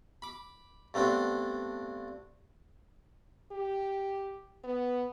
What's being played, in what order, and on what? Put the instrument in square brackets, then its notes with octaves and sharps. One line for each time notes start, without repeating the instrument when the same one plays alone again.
[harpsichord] B5 D6
G2 A3 B3 C4 D4
[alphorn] G4
B3